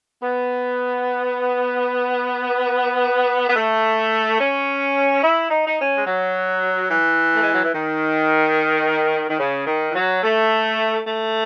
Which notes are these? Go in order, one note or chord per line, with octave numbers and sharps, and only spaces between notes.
B3
B3
A3
C#4
E4
D#4
D#4
C#4
G#3
F#3
E3
A3
G#3
F#3
E3
D#3
D#3
C#3
D#3
E3
F#3
A3
A3